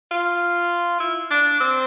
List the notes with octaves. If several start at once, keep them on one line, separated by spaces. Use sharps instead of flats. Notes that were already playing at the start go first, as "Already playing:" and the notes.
F4
E4
D4
C4